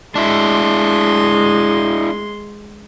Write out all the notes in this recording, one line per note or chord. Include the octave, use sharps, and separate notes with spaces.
G#3 D4 E4 C6